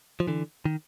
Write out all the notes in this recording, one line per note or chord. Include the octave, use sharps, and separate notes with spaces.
F3
D3 E3
D#3